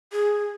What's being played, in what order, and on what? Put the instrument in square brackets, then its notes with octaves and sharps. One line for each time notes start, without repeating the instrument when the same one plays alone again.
[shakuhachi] G#4